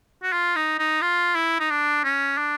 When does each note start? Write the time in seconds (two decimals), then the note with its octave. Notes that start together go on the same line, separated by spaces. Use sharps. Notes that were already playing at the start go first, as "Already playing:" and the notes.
0.23 F#4
0.33 F4
0.56 D#4
0.79 D#4
1.01 F4
1.35 E4
1.60 D#4
1.70 D4
2.04 C#4
2.38 D4